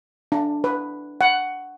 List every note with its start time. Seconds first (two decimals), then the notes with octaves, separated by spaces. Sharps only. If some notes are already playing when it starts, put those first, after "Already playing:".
0.32 D4
0.64 B4
1.21 F#5